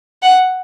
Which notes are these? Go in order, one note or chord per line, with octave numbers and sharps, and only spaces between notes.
F#5